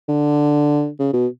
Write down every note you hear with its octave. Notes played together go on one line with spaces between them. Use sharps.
D3
C#3
B2